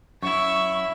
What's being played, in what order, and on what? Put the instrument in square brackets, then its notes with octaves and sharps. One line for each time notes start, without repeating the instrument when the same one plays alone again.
[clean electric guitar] F#2 E4 [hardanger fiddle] E5 [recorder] C#6